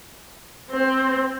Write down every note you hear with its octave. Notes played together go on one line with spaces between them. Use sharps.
C4